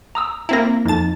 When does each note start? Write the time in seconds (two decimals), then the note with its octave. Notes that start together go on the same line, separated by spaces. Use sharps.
0.15 A#5 D#6 E6
0.49 A#3 C4 E4 A#5 A#6
0.86 F2 D#4 A5 A6